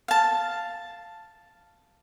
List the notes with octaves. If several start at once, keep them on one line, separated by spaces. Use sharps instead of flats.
F5 A5